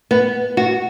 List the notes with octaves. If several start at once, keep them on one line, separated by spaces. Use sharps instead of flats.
B3
F#4